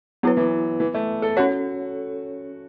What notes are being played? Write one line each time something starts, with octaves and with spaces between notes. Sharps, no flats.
F#3 B3 E4 B4
E3
E3
A3
A4
C#4 F#4 A4 C#5